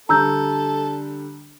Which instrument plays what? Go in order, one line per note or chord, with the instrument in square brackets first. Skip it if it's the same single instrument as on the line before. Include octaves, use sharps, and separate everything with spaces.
[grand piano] D3 G3 [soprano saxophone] A4 [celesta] A#5 E6 G6